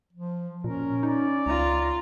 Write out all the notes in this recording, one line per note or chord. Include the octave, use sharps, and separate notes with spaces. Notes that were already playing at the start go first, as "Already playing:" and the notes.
F3
A#2 C#4 A#4
D#4 D5
C#2 F4 A#5